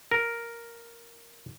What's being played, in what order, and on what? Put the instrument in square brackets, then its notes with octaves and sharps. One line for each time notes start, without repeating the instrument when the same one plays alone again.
[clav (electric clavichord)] A#4